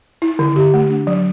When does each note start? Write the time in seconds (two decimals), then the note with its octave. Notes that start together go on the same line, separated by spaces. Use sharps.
0.22 E4
0.39 D3
0.56 G4
0.74 A3
0.90 D4
1.07 F#3